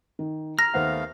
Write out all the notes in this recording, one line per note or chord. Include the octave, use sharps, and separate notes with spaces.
D#3
A#5 F6 A#6
D#2 A3 B3 C5 F5 F#5